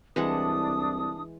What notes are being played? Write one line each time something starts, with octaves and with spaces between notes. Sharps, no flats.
C2 E3 G#3 D4 F#5 D#6